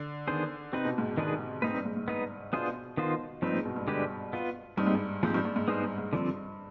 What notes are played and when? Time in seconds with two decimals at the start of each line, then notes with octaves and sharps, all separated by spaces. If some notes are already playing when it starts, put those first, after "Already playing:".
Already playing: D3
0.28 D#3 B3 D4 G#4 C5
0.72 C3 C4 D#4 B4
0.85 B2
0.98 G#2
1.11 B2
1.18 D#3 G#3 D4 G#4 B4
1.62 G#2 C4 D#4 B4
1.74 G2
1.85 G#2
1.96 G#2
2.07 G#2 B3 D#4 B4
2.53 B2 B3 D4 F4 G#4 C5
2.97 D#3 B3 F4 C5
3.42 G2 F3 C4 D#4 B4
3.54 G#2
3.66 B2
3.76 G2
3.88 D3 G#3 D4 G4 B4
4.33 B3 F4 B4
4.77 G2 G3 C4 D#4
4.86 G#2
4.95 G2
5.23 G#2 F3 C4 D#4 G4
5.34 G2
5.45 G2
5.56 G#2
5.68 G2 B3 D#4 G#4 C5
5.83 G2
5.98 G#2
6.13 G2 D3 F3 C4